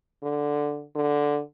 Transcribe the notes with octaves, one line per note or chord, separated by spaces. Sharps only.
D3
D3